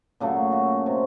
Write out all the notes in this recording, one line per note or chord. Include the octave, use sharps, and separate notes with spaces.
A#2 C#3 F#3 A3
F#4
C3